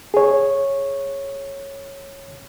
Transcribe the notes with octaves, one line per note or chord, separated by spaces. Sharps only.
G#4 C#5